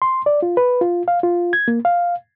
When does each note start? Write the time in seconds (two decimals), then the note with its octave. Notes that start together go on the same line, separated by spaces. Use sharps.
0.02 C6
0.26 D5
0.42 F4
0.57 B4
0.81 F4
1.08 F5
1.23 F4
1.53 G#6
1.68 A#3
1.85 F5